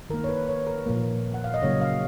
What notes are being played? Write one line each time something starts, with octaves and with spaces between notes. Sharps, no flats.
D#3 A#3 A#4
C#5
B4
C#5
A#4
A#2 F3 A#3
F#5
F5
D#5
C#3 F#3 A#3 C#5
F5